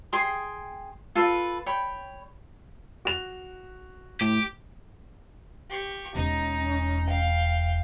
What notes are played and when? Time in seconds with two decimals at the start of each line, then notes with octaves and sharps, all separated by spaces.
0.12 G#4 G5 C6 D#6
1.15 F4 A4 B4
1.66 C#5 G5 B5
3.05 F#4 F7
4.21 A2 G4
5.70 G4 C#6
6.15 E1 C#4 D#4
7.06 F5 G5